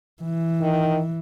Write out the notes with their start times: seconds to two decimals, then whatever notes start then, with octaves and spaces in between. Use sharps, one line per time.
0.23 E3
0.61 D#3